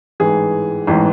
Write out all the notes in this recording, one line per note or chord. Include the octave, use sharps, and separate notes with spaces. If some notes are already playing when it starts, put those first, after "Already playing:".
A1 G#2 E3 G#3 G#4
A1 G#2 E3 G#3